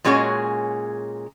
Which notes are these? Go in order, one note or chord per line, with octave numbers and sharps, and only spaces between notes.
A#2 G#3 C#4 F#4 G#4 C#5